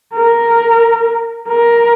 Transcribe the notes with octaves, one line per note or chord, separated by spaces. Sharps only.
A#4
A#4